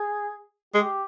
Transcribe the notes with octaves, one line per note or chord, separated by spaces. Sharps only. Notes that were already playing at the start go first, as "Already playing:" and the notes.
Already playing: G#4
G#3 G4